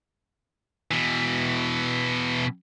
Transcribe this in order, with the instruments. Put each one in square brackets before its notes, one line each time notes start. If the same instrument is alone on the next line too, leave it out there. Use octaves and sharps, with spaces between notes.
[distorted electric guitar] B2 E3